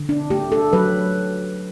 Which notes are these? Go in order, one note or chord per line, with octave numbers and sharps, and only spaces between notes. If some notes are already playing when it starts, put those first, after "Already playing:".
Already playing: D3
D4
A3 G4
A4
F#3 B4